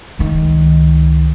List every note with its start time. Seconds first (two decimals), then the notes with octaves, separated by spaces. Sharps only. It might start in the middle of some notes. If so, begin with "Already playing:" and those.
0.19 C#2 D#3